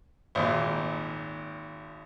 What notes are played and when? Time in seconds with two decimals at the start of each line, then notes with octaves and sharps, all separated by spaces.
0.35 G#1 D#2 A#2